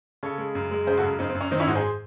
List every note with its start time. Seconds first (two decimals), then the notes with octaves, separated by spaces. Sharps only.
0.23 C#3 A4 C#5
0.38 G#3
0.55 F#2
0.71 G#3
0.87 C#3 G#4 C5
0.98 F#4 A4
1.03 F#2
1.19 F#2 C4 D#4
1.30 C4
1.35 F#2
1.41 C#4
1.51 D#3 C4 D#4
1.60 C#4 E4
1.67 G#2 D#4 F#4
1.75 G#4 C5